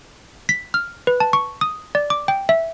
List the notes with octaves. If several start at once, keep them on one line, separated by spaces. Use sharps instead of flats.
B6
F6
B4
A5
C#6
D#6
D5
D6
G5
E5